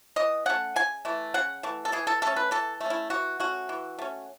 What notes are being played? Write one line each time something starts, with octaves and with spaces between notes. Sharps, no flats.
E3 D#5
A3 C#4 F#5
C#3 G#5
E3 A3
C#3 F#5
E3 A3
A4
E3 G#4
A4
A3 C#4 A4
B4
E3 A4
A3
C#4 E4
E3 F#4
A3 C#4 F#4
E3
A3 C#4